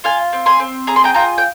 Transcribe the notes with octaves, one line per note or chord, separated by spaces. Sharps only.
F4 F5 G#5
C4
G#5 C6
C4
G#4 A#5
C6
G5 A#5
F4 G5 A#5
G5